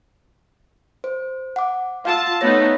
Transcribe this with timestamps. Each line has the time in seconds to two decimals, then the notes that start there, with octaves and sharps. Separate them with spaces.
1.04 C5
1.56 F#5 D6
2.05 F4 F5 A5 E6
2.41 A3 B3 D#4 C#5 A#6